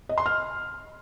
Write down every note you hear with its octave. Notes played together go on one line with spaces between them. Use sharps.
D#5
C6
F6